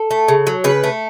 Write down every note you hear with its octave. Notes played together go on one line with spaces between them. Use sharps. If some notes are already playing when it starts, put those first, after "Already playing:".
Already playing: A4
A3
C#3
F#3
C#3 B4
A3